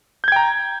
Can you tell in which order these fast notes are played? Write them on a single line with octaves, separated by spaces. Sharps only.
G6 G#6 G5 A#5